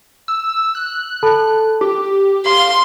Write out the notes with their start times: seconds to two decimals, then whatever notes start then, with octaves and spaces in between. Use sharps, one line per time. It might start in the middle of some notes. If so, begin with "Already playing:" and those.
0.28 E6
0.75 F#6
1.23 A4 A5 B5
1.81 G4 D6
2.46 F5 C6